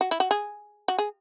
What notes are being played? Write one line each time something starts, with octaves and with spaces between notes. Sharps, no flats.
F#4
E4
F#4
G#4
F#4
G#4